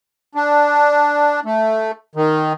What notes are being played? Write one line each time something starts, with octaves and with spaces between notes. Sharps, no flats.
D4
A3
D#3